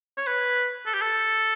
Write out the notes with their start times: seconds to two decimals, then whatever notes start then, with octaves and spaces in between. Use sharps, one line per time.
0.17 C#5
0.27 B4
0.86 A4
0.94 G4
1.01 A4